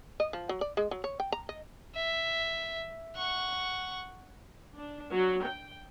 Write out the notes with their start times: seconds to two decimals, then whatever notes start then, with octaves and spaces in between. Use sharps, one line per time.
0.20 D#5
0.33 F3
0.49 F#3
0.61 D5
0.77 G#3
0.91 F#3
1.04 C#5
1.20 G5
1.32 A#5
1.49 D#5
1.95 E5
3.16 F#5 C#6
4.76 D4
5.13 F#3
5.45 G5